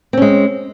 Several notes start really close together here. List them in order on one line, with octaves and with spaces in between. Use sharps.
C4 C#4 G#3